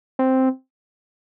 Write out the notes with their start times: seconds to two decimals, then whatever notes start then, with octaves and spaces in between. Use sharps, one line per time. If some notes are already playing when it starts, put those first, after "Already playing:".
0.19 C4